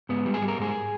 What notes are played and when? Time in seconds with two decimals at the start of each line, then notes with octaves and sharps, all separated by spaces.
0.09 G#2 B3
0.26 G3
0.34 G#4
0.42 G3
0.48 A#4
0.58 G#2 G#4